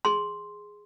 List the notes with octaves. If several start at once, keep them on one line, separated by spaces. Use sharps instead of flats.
G#4 C6